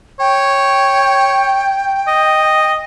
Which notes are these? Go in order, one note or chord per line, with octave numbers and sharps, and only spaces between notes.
C#5 G5
D#5